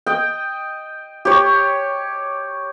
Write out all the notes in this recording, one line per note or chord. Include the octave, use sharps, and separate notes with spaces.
D#5 G5
G4 C#5